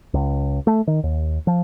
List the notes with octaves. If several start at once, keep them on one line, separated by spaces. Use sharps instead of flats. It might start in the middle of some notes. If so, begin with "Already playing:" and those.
C#2
A3
D#3
D#2
F3